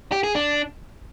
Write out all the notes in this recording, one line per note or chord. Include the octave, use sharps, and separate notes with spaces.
G4
G#4
D4